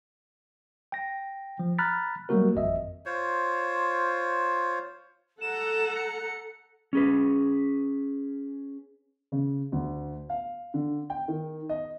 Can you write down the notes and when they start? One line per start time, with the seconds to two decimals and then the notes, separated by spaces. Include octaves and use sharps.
0.92 G5 A#6
1.59 F3
1.78 A#5 B5 F6 F#6 A6 B6
2.29 F#3 G3 A3 A#3 F#4 A#4
2.55 G#1 F2 D#5 E5
3.06 F4 C5 C#5
5.41 A4 F#5 A#5 E7
5.95 C#7
6.93 C#4 G#4 B4
9.32 C#3
9.72 D2
10.30 F5
10.74 D3
11.10 G5
11.28 D#3
11.69 D#5